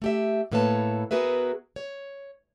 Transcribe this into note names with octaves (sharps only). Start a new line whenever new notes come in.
A3 G4 E5
A2 A#3 A4 B4 C#5 A5
B3 F#4 G#4 A#4 B4 E5
C#5